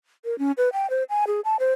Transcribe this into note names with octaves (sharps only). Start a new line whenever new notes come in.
A#4
C#4
B4
G5
C5
G#5
G#4
A5
C5